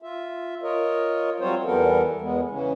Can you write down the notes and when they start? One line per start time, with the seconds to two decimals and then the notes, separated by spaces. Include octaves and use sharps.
0.02 F4 E5
0.63 F4 A#4 C#5 D#5
1.40 F#3 G3 C4 F4 C5 C#5
1.65 E2 E3 G3 B3 A4 A#4
2.21 E2 G#3 B3
2.51 C#3 E3 C#4